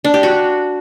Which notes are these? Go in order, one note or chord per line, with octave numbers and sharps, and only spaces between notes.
D4
G4
F#4